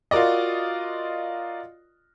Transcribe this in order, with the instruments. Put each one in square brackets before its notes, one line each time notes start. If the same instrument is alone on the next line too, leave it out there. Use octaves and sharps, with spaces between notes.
[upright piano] F4 F#4 A#4 D5 D#5